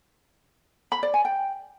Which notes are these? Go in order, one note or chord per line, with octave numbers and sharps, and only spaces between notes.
B5
D5
G#5
G5